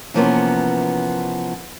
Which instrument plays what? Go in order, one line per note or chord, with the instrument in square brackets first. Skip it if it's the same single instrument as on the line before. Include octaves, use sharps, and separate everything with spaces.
[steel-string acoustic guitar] C3 E3 F3 A#3 B3 C#4